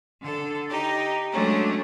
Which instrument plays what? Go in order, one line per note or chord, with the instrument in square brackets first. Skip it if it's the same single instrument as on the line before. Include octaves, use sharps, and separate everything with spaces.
[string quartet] D3 A4
D#4 G4
F#3 G#3 A3 C#4 D4